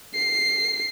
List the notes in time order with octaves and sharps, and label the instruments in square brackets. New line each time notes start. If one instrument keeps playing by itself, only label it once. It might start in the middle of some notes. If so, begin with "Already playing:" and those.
[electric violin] C7